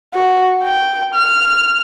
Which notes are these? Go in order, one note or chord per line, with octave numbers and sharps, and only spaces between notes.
F#4
G5
F6